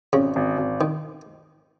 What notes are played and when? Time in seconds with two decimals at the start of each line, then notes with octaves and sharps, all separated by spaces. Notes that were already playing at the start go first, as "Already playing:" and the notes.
0.13 G#1 C#3
0.36 G#1
0.58 G#1
0.81 D#3